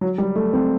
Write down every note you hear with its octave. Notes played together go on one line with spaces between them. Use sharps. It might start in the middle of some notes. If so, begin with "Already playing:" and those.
F#3
G3
A3
C4